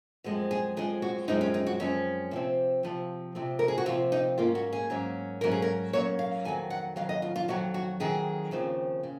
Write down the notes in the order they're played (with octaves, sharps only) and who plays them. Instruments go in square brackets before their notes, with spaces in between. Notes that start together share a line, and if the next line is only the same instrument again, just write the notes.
[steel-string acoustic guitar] F#2 F3 G#3 C4
G#4
F#2 F3 G#3 C4 G#4
F#4
F#2 F3 G#3 C4 D#4
C#4
D#4
F#4
F#2 F3 G#3 C4 C#4
C3 F3 C4
C3 F3 C4
C3 F3 C4
A#4
G#4
F#4
C3 F3 C4 F4
D#4
G#2 F#3 A#3 C#4 F4
F#4
G#4
G#2 F#3 A#3 C#4
G#2 F#3 A#3 C#4 A#4
G#4
A#4
G#2 F#3 A#3 C#4 C#5
F5
F2 D#3 F#3 G#5
F#5
F2 D#3 F#3 F5
D#5
F4
F4
F2 D#3 F#3 F#4
F#4
F2 D#3 F#3 G#4
D#2 C#3 F3 C4
C#3